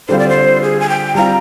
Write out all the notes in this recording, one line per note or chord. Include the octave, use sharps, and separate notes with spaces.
D3 G3 C4 F4 C5
D5
C5
G#4
G#5
G5
G3 C4 F4 A#5